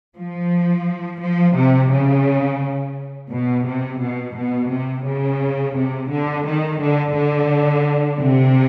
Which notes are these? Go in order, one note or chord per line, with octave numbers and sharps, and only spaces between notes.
F3
F3
C3
C#3
B2
C3
B2
B2
C3
C#3
C3
D3
D#3
D3
D3
C3